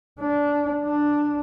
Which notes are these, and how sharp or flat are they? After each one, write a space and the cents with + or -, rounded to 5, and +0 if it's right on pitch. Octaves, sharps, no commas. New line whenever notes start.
D4 -15
D4 +5